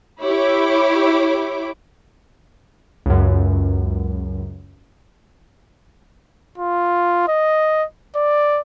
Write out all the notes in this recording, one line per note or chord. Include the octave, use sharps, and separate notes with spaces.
E4 G4 C#5 D6
C#2 F#2
F4
D#5
D5